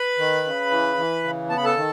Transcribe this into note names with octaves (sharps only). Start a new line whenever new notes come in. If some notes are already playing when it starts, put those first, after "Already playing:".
Already playing: B4 B5
D#3
C#3
E3
E3
C#3
B3 A5
B5
A4 A5
D#3